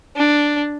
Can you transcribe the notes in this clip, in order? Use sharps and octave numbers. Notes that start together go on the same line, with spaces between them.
D4